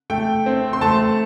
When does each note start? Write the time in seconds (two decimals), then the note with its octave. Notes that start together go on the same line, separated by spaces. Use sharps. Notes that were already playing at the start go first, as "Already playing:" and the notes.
0.10 A3 G5
0.46 C4
0.73 C6
0.81 A3 A5